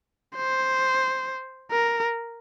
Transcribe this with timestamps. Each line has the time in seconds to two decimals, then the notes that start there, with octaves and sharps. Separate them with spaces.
0.37 C5
1.71 A#4